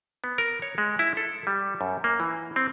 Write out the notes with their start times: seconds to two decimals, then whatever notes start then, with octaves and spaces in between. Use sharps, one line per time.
0.24 B3
0.38 A#4
0.62 C#5
0.78 G#3
0.99 E4
1.17 A4
1.47 G3
1.81 F#2
2.04 A#3
2.20 E3
2.56 C4